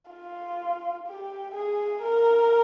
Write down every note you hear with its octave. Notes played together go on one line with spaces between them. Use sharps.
F4
G4
G#4
A#4